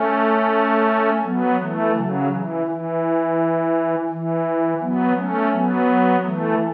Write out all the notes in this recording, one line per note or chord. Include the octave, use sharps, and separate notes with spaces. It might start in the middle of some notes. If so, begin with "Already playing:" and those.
Already playing: A3 C#4
F#3 B3
E3 A3
C#3 F#3
E3
E3
E3
F#3 B3
A3 C#4
F#3 B3
E3 A3